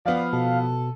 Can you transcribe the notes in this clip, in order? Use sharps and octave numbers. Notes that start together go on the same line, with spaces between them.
F3 B3 D5 F5
B2 A4